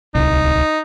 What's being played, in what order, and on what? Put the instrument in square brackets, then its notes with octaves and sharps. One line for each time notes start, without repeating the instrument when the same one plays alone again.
[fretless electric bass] D1 C2 [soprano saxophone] D#4